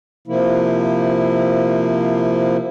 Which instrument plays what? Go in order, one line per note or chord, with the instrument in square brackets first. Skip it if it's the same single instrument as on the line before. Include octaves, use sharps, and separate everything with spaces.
[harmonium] C3 F3 A#3 E4